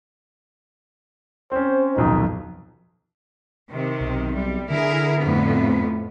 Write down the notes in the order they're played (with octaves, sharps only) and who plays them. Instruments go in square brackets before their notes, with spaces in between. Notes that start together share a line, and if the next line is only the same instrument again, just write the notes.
[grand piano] C4 C#4 [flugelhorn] C5
[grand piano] D#1 B1 F2 [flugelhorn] D#4
[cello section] C3 D#3
[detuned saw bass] B1
[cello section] G3
[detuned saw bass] D3 [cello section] E4 G#4 A#4
[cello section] F2 A2 B3